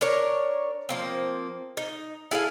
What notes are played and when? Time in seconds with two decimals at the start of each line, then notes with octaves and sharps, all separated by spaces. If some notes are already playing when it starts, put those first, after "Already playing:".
0.01 D4 A#4 C#5
0.89 F3 A#3 C4
1.77 D#4
2.31 E4 G#4 A4 F5